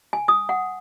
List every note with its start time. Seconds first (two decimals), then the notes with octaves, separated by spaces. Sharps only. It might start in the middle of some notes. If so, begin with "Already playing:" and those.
0.13 G#5
0.28 D#6
0.49 F#5